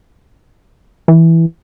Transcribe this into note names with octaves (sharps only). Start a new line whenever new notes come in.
E3